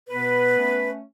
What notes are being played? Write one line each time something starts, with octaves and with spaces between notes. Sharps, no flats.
B2 B3 B4
A3 C#4